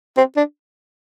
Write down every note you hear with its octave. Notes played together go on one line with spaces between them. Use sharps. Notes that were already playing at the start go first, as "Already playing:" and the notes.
C4
D4